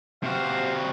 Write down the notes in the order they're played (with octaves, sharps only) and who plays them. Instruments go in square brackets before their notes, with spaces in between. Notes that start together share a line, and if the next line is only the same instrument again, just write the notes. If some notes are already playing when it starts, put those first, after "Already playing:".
[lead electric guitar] C3 F#4 [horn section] G4 C5 F5